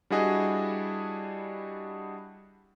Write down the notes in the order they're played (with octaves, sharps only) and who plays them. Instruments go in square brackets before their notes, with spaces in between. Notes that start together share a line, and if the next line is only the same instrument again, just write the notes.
[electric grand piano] G3 D4 E4 F#4 G#4 D#5